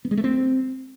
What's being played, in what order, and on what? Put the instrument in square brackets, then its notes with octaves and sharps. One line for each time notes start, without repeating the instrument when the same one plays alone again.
[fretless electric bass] B3
G#3
A3
C4